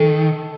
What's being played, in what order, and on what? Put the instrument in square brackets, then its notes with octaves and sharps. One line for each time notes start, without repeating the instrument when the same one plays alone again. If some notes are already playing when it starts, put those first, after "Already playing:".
Already playing: [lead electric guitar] D#3 [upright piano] A4